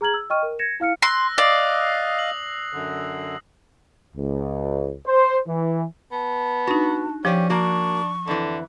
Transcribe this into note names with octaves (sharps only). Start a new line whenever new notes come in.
G#4 A#5 F6 G#6 F#7
E6
D#5 G5 C#6 F6 D#7
A#4
G#6 A#6 C#7 E7
E4 F5 F6 C#7
C6 E6 F#6 A#6
D5 D#5 F5 D#6 C7
F#7
F#2 D3
C#2
C5
E3
B3 A5
D4 D#4 F#4
F3 C#4 G4 C5 D5 G5 D6
A#3 D4 F#4 C#6
F2 D3 E3